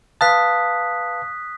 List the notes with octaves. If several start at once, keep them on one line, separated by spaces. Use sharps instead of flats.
B4 F5 A5 D#6 F#6 B6